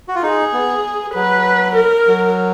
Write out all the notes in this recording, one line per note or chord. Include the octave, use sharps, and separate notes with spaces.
F#4
F4
D#4 G#4
B3
F#3 B4
A#4
F#3